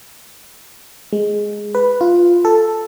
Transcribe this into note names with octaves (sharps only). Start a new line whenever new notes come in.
G#3
B4
F4
A4